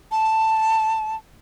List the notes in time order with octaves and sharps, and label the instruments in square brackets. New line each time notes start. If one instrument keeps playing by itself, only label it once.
[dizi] A5